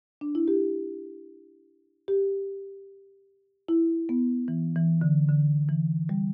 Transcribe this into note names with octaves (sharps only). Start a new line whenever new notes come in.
D4
E4
G4
G4
E4
B3
E3
E3
D3
D3
E3
G3